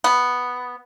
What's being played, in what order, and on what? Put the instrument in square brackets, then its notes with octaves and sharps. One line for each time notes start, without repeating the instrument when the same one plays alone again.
[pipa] B3